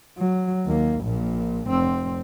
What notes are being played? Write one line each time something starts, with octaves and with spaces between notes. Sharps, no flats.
F#3
D#2 A#3
A#1 A#2
F1 C4